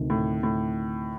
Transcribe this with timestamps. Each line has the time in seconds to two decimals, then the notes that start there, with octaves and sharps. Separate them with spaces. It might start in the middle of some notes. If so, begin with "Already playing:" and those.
Already playing: D2 C3 D#3
0.10 A2
0.43 A2